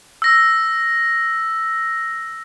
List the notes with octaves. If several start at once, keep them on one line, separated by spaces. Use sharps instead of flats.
E6 A#6